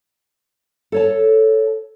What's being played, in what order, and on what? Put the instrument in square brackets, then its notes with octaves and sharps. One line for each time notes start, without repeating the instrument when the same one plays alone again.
[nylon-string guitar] A4 C#5 A5